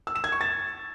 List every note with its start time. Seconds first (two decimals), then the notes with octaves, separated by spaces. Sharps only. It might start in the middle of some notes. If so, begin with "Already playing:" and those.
0.07 E6
0.15 E7
0.24 G#6
0.32 C#6
0.41 A6